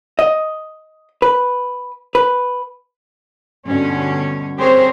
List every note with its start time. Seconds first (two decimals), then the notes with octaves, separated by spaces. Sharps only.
0.19 D#5
1.22 B4
2.15 B4
3.67 G2 B2 D3 C#4 C#5
4.57 C4 G4 G#4 A#4 C5 C#5